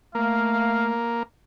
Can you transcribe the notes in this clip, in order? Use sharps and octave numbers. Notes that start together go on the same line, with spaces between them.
A3 A#3 F5